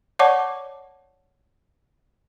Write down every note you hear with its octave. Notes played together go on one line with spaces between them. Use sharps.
C#5 D5 F#5 A5 C#6 D6